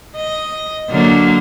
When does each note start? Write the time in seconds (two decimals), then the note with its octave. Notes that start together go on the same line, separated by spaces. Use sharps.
0.16 D#5
0.90 D3 F#3 A#3